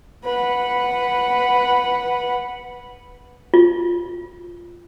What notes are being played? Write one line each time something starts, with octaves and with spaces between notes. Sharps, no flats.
B4 F#5
F4